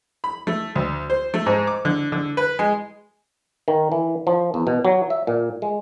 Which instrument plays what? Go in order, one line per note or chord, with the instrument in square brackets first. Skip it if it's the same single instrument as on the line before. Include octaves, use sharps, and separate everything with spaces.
[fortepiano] B5
A3
D2
C5
A3
G#2
D6
D3
D3
B4
G#3
[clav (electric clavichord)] D#3
E3
F3
E2
B2
F#3
E5
A#2
G#3